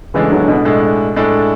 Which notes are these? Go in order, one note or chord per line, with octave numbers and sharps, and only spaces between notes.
A2 C#3 E3 G#3 D4 A4
D3 F#3
B2 D3
A2 G#3 D4 A4
A2 G#3 D4 A4